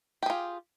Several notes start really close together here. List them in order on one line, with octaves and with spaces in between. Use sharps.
G4 G#4 F4